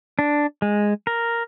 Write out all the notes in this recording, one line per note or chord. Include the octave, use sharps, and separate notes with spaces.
D4
G#3
A#4